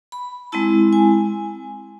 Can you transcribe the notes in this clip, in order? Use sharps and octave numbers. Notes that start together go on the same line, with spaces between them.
B5
G#3 C4 E4 A5
G#5